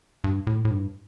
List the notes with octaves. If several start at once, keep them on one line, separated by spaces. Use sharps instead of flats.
G2
A2
A2
G2